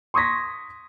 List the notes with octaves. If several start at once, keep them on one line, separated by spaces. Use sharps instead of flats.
C6 C#6 D#6 G#6 A#6 B6